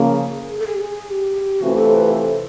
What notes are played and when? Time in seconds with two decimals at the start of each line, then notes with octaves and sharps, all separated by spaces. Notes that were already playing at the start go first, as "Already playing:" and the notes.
Already playing: C#3 F3 A#3 G#4
0.59 A4
0.67 G#4
0.74 G4
0.81 G#4
1.10 G4
1.60 C3 E3 A3 C4 F4 F#4
1.78 A4
1.94 B4
2.11 A4